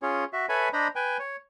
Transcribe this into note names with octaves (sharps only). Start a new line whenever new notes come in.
C#4 F4 G#4 C#5
F#4 E5
A4 B4 C#5 E5 G#5 B5
D4 C5 D#5 A#5 B5
B4 G5 G#5
C#5